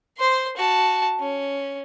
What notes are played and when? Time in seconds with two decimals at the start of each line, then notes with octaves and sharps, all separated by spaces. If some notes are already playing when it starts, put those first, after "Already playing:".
0.18 C5 C6
0.57 F#4 A5
1.19 C#4